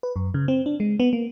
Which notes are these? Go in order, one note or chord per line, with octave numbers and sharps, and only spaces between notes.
B4
F#2
C#3
C4
D4
G#3
B3
A#3